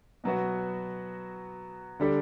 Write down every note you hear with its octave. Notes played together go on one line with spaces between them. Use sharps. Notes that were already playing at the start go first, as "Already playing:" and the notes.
B2 F#3 B3 F#4
D3 G3 D4 A4